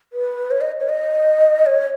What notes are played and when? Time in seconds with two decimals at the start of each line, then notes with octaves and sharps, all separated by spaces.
0.13 B4
0.51 C#5
0.61 D#5
0.80 C#5
0.89 D#5
1.66 C#5